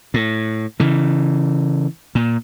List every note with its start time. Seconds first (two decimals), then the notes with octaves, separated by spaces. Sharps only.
0.14 A2
0.80 C#3 E3
2.15 A#2